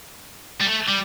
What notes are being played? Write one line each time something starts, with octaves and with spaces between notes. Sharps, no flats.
G3
A3
G3